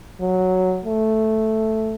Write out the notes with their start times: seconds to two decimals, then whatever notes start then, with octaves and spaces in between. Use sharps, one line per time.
0.21 F#3
0.85 A3